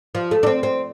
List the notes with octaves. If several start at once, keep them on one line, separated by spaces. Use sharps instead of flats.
F3
A3
D4
C4
C4